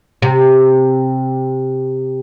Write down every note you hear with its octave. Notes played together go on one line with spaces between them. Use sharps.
C3